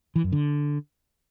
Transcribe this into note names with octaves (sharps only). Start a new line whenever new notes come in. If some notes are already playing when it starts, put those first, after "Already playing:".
E3
F#2
D3